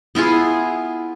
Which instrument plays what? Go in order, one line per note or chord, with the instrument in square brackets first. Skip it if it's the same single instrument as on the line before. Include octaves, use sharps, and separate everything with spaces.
[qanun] B3 E4 F4 G#4